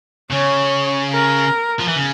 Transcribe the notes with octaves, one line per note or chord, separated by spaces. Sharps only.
C#3 C#5
A#4
F3
E3
C#3